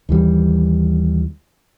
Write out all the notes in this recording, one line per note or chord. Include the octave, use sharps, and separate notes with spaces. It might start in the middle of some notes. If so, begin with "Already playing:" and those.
D#2 E3 G3